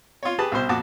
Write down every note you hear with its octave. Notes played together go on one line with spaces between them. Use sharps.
F4 C#5
G4 G#4 B4 A5
C2 B2 C5
F2 A#2 F#4 A5 D6